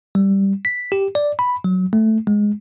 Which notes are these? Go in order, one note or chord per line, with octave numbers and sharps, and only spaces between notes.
G3
B6
G4
D5
B5
F#3
A3
G#3